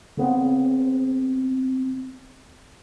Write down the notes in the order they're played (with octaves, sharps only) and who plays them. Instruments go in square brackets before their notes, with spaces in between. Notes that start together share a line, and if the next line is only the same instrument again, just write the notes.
[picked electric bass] C#3 B3 C4